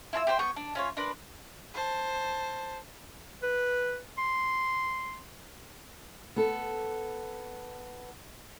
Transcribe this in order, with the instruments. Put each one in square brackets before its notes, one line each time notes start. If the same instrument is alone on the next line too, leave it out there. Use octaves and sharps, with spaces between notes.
[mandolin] E4 F4 A5 E6
G4 C5 G5 C6
B3 C#5 G5 C#6
D4
C#4 F4 C#5
D4 A#4 B4 C6
[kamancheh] C5 A5
[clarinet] B4
C6
[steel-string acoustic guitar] B3 A4